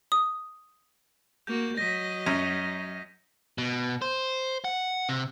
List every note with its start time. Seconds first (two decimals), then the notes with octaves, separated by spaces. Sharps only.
0.12 D#6
1.47 A#3 F#4 G6
1.78 F#3 D#5 A#6 B6
2.26 F#2
3.58 B2
4.02 C5
4.64 F#5
5.09 C3